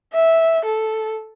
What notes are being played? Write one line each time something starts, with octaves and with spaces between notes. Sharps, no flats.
E5
A4